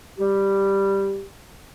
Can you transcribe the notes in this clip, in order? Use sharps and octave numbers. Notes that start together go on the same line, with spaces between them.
G3 G4